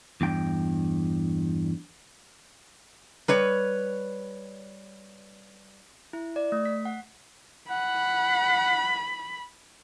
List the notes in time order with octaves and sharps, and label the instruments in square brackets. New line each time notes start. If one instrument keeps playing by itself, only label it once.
[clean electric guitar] E2 G2 G5
[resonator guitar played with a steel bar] G3 B4 C#5
[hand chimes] E4
D5
A3
B6
F#5
[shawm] F#5 [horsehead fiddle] B5